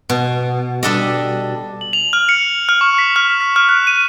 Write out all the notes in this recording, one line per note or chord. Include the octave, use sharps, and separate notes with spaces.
B2
G3 D4 A4 D#5
F#7
F7
F6
C#7
F6
C#6
B6
F6
B6
F6
F#6
D#7